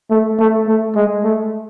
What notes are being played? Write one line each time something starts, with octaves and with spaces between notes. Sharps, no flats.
A3
A3
A3
G#3
A3